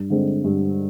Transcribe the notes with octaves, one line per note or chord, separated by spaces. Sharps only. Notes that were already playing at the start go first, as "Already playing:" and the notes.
Already playing: G2
D3 G#3 C4
G2